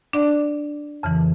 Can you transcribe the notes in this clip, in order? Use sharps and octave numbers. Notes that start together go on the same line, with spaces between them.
D4 D5
F2 C#3 E3